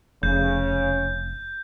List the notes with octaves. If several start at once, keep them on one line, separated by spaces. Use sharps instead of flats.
F1 C#3 G6